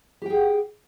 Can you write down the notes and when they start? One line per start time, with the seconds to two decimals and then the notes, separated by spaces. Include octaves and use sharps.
0.22 G4
0.26 G5
0.30 G#4
0.34 F#5